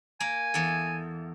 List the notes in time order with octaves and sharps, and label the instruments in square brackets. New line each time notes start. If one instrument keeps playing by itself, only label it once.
[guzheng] A#3 [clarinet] G#5
[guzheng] E2 A4